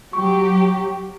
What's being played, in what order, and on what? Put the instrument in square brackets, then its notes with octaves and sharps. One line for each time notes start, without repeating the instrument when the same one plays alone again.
[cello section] F#3 G4 [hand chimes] C#6